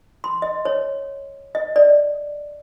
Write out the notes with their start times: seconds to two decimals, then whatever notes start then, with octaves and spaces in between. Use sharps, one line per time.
0.24 C6
0.42 D#5
0.65 C#5
1.55 D#5
1.76 D5